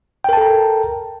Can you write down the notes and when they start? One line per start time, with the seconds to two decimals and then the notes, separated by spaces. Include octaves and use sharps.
0.24 G5
0.29 A#4
0.33 A5
0.37 A4
0.41 A#5